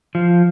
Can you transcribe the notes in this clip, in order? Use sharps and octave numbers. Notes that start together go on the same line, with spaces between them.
F3